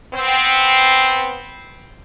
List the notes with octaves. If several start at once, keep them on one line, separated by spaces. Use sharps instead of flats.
B3 C4